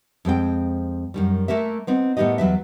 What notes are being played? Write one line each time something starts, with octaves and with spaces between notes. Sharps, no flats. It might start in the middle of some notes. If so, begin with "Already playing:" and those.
F2 G#3 C4 G5
F#2 D#3 G3
A3 A#3 A#4 E5
B3 C4 D#4
A2 D#3 B3 D#4 G4 D#5
E2 F#3 B4 E5